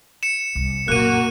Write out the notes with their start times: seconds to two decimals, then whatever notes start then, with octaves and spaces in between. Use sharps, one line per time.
0.23 C#7 E7
0.55 C2
0.88 F#2 A#2 A#3 F#4 F#6 D#7